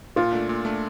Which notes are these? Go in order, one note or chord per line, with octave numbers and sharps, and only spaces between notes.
A#2 F4
A3 D4
A#2
A3 D4